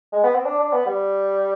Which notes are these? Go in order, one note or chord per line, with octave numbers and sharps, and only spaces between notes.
G#3
B3
C4
D4
D4
B3
G3